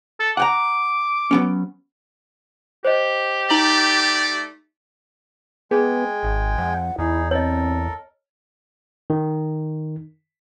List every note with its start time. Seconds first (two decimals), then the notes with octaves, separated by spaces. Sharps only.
0.20 A4
0.37 F#5 G5 A#5 D6
1.31 F#3 B3 C#4
2.85 G4 C5 D#5
3.50 A3 D#4 D5 A#5 F#7
5.71 G#3 B3 G#4 G5 G#5
6.23 G#1
6.58 F2 F#5
6.98 E2 D#4 E4 G#4
7.31 C4 A4 A#4 C#5 D#5
9.10 D#3